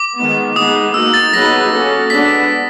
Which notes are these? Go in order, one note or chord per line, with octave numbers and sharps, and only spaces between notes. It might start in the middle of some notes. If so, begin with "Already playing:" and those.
Already playing: D6
D#3 G#3 B3
G#3 B3 D#4 G#4 D#6
A#3 D#4 F#4 E6
A6
F#3 B3 D#4 G#4 B4 A#6
A#3 C#4 F#4 A4
G#3 B3 D4 B6